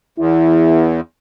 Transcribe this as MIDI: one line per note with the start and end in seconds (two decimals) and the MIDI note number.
0.18 1.00 40
0.18 0.90 64